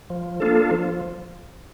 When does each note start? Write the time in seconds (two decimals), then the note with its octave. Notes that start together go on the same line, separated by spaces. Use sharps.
0.10 F3
0.40 A#3 D4 F4 A4
0.71 F3